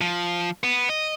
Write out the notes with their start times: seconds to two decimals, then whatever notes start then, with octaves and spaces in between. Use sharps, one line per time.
0.01 F3
0.63 B3
0.89 D#5